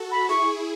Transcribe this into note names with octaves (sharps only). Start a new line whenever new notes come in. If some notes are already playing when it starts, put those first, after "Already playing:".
Already playing: F#4 A4
B5
E4 G#4 C#6